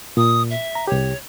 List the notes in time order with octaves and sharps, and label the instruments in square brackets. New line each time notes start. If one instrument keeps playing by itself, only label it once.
[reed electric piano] A#2 [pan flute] D#6
[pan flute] E5
[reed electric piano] A#5
[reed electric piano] C2 G4 [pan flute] C#5